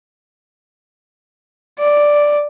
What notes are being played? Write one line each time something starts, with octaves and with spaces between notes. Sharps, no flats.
D5